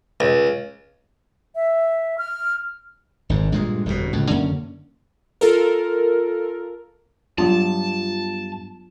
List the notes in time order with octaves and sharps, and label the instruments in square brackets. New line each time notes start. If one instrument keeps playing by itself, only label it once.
[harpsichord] C#2
[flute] E5
F6
[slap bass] G#1 G#2
G2 A#2 G#3
G1 F2 G#2 B2
C#2 A2
F#2 D3 A#3 C#4
[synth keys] F4 A4 A#4
[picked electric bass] G2 [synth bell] F#3 B3 F4 [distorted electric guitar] A5